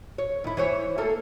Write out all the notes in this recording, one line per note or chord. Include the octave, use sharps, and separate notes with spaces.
C#5
D#2 E4
E3 C5 C#5
A3 A#3 A4